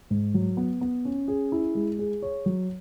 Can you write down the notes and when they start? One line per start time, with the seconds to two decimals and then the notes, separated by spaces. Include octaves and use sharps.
0.10 G#2
0.34 F#3
0.57 B3
0.81 B3
1.05 C#4
1.28 G#4
1.52 E4
1.75 G#3
1.99 G#4
2.22 C#5
2.46 F#3